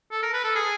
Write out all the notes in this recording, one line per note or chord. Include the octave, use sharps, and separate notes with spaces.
A4
A#4
B4
A4
G#4